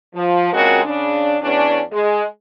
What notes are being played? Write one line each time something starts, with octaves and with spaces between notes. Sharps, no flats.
F3
A#2 C#3 G#3 C4 F#4 A#4
C#3 D4
E2 C#4 D4
G#3